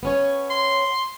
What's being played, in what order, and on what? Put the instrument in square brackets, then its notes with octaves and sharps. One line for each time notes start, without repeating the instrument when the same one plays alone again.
[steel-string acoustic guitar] B3 C#4 C#5
[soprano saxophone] C6